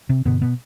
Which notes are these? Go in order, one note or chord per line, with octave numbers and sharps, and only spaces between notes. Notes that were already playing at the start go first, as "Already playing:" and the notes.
C3 C4
G2 B2 D3 B3
B2 B3